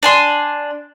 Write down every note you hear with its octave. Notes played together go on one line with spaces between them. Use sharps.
D4 G#5 C6